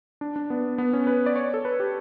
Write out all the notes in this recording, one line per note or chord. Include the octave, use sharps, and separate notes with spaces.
D4
D4
B3
B3
C#4
B4
D5
C#5
A4
B4
G4